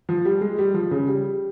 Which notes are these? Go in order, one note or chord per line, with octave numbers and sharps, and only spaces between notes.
F3
G3
G#3
G3
F3
C#3
G3